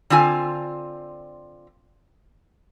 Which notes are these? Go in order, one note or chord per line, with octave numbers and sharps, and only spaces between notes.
D3 C4 F4 G#5